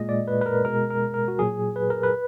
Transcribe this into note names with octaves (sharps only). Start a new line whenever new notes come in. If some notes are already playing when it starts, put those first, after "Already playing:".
Already playing: A#2 G#3 D#5
D5
B4
B4
A#4
B2 G#3 A#4
A#4
A#4
F#4
A#2 F#3 G#4
B4
A#4
B4